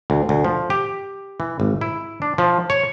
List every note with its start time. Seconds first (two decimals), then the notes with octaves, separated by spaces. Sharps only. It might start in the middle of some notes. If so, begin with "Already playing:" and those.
0.10 D2
0.29 D2
0.44 F3
0.70 G4
1.40 E3
1.60 G#1
1.81 E4
2.22 D4
2.38 F3
2.70 C#5